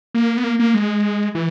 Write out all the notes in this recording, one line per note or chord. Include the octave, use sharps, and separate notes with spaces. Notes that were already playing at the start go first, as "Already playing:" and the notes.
A#3
B3
A#3
A#3
G#3
E3